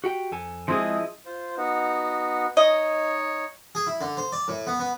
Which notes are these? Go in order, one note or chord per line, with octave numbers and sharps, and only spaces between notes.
F#4 G4 G5
F2 A4 G#5
F3 G#3 C4 E4 G#4 D#5
F4 C5
B3 D#4 F#4
D#4 C#5 D#5
G#4
E4
D3
C5
D5
A2
B3
B3